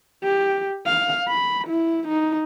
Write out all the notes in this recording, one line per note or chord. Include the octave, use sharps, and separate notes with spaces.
G4
F5
B5
E4
D#4